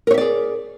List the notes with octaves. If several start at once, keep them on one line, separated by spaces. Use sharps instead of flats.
G#4 A#4 C#5 D5 E5